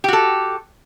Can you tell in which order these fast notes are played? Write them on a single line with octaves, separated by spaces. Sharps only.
G4 F#4 A4